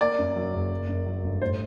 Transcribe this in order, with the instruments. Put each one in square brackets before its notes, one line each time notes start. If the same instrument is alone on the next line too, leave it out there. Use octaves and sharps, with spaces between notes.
[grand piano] A#3 [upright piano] D5
[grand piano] F#2
F#3
F#1
A#3
F#2
F#3
G1
[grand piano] A2 [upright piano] C5